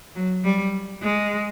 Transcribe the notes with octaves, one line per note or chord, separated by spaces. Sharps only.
F#3
G3
G#3